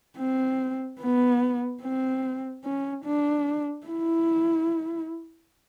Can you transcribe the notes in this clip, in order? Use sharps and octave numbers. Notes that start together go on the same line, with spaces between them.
C4
B3
C4
C#4
D4
E4